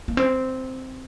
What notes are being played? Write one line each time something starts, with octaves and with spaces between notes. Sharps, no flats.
A#3
C4